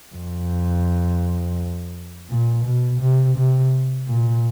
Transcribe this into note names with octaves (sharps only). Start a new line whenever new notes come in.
F2
A#2
B2
C3
C3
A#2